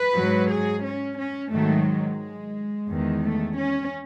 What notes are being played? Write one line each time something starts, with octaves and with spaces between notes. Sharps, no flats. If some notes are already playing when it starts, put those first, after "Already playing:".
Already playing: B4
G#2 F#3
G#4
C#4
C#4
G#2 D#3 F#3 A3
G#3
E2 D#3 G#3
A3
C#4